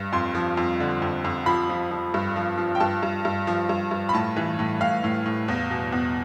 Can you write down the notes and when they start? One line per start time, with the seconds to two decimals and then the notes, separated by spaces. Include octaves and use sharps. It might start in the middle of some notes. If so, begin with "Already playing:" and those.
Already playing: G2
0.13 F2 C6
0.35 F3
0.57 F2
0.80 D3
1.02 F2
1.25 F2
1.46 F3 B5
1.69 F3
1.91 F3
2.14 G2
2.36 F3
2.57 F3
2.75 G5
2.80 G2 A5
3.03 G2
3.25 G2
3.47 F3
3.69 G2
3.91 G2
4.09 B5
4.13 A2 A5
4.36 E3
4.59 A2
4.80 A2 F5
5.04 A2
5.26 A2
5.48 E2
5.71 B2
5.92 E2